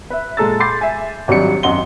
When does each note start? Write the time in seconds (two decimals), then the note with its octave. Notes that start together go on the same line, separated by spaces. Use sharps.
0.10 B4 E5
0.37 A#2 G#3 A4 A#5 E6 A6
0.60 B5 C6 D6 G6 A6 C7
0.81 E5 G#5
1.28 G#1 F#3 G3 D4 C#7
1.63 G#1 F#2 D#5 F#5 C6 G7